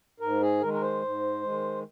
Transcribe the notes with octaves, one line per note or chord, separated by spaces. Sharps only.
G#2 A#4
G#4
D#3 G#3 A#4
A#4
C5
G#2
D#3 G#3